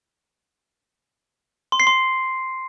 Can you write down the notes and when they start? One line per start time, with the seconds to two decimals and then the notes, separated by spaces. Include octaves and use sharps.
1.72 C6
1.80 C7
1.87 C6